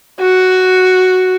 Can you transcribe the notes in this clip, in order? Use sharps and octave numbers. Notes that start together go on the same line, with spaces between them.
F#4